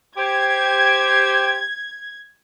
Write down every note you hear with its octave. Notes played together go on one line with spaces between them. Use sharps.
G4 C5 G#6